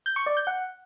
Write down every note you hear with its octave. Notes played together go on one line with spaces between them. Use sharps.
G6
C#6
D5
G6
F#5